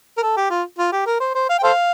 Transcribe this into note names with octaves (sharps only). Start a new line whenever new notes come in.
A#4
A4
G4
F4
F4
G4
A#4
C5
C5
F5
G5
A4 C5 F5